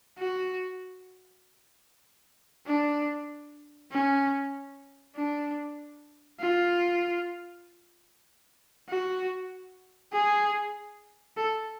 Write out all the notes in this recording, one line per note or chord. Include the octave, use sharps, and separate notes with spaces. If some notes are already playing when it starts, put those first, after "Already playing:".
F#4
D4
C#4
D4
F4
F#4
G#4
A4